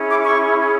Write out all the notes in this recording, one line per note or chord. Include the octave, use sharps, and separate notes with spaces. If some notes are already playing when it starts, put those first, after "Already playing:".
Already playing: C#4 E4 G#4
D6
C#6